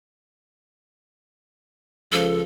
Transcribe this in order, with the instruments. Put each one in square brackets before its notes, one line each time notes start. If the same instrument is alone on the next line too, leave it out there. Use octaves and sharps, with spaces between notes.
[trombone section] C#2 F3 [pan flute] A4